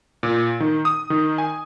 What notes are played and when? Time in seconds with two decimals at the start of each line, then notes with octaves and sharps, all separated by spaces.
0.23 A#2
0.60 D#3
0.85 D#6
1.10 D#3
1.38 G#5